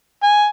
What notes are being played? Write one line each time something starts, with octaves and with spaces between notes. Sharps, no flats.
G#5